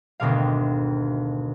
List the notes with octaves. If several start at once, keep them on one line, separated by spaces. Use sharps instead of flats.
G#1 D2 B2 D3 G3 F5